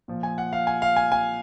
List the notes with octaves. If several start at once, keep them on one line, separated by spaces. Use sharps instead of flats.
A#2 F3
G#5
F#5
F5
G#5
F5
G#5
G#5